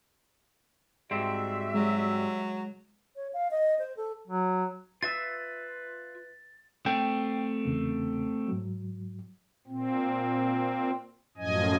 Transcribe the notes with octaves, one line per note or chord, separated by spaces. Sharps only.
G#2 G3 C4 F#4 E5
F#3 G#3
C#5
F5
D#5
C5
A4
F#3
F4 B4 E5 E6 A6
A3 C4 G5
E2 C#3 A#3
G#2 F#3
A#2 C4
F#2 A2 F3 D#5 G#5